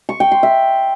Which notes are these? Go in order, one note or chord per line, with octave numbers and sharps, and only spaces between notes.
C#6
G5
C6
E5